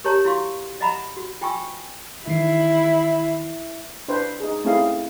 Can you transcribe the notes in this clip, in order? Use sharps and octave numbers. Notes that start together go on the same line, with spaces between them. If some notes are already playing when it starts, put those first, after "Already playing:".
G4 A#4 C#5 A5 A#5
E4 F#4 F5 C6 C#6
D#5 E5 F#5 A#5 B5
F#4
F4 G5 G#5 C#6 E6
D#3 E3 E4 C7
D4 B4 C5
D#4 G#4
A3 C4 C#4 E4 G#4 F5